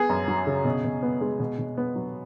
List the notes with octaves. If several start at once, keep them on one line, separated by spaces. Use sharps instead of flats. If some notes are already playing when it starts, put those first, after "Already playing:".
Already playing: B3 G#4
F#2
F#3
C#3
B2
B2
B3
G#3
B2
B2
B3
F#3